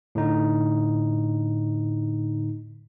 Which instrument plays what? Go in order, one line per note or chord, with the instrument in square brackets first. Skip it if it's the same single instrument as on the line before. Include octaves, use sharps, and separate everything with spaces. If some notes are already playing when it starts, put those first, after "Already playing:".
[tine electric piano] A2 D3 D#4